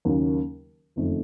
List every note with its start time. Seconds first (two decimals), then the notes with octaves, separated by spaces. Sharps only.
0.05 D#2 C#3 F#3 A#3 C#4
0.96 F#1 F2 D#3 A3